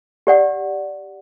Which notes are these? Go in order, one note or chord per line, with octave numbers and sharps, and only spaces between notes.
G4 D5 F#5